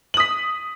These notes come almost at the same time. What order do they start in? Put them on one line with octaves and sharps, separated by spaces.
F#7 D#6 B6